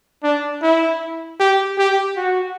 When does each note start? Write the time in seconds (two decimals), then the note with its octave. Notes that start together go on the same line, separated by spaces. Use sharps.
0.23 D4
0.62 E4
1.40 G4
1.78 G4
2.17 F#4